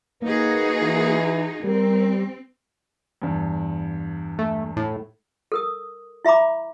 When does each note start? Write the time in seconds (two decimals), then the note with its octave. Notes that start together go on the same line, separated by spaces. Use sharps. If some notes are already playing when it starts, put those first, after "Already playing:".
0.22 A#3 D#4 F#4 G#4 B4
0.82 E3
1.64 G3 C4 A#4
3.22 E2 G2
4.39 A3
4.77 A2
5.52 A4 A#4 D#6
6.25 E4 E5 A#5 B5 D6